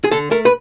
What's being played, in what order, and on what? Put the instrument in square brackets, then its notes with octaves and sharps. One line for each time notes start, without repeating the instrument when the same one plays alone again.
[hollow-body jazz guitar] G#4
D3 A4
A3 A#4
B4